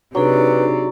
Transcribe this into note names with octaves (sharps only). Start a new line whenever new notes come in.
C3 F#3 D4 D#4 G#4 B4 D5